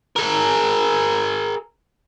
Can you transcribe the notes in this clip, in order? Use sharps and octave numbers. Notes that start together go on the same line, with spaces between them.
G#4 A#4